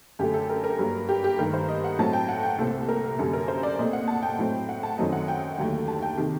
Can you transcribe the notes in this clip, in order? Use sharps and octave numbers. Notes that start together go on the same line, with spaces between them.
F#2 D3 A3 G4
A4
A#4
A#4
G2 F#3 A#3
G4
G4
G2 D#3 A3 A#4
C5
D#5
F#5
A2 F#3 C4 A5
G5
F#5
G5
C2 A#2 A3 C4 A4
A#4
F#2 D3 G3 A#3 A4
A#4
C5
D5
A#2 A3 C4 D#5
F#5
A5
G5
A2 F#3 C4
F#5
A5
F#2 D#3 F#3 A3 C4 D#5
F#5
G5
D#2 D3 F#3 A3
A5
G5
C3 D#3